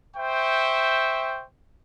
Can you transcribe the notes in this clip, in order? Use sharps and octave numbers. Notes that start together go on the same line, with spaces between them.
C5 E5 G5 C#6